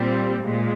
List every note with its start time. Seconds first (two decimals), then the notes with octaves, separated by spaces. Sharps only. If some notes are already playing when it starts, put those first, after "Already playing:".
Already playing: A#2 G3 C4
0.43 A#2 G#3